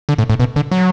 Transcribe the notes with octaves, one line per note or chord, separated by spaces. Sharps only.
D3
A2
A2
B2
D3
F#3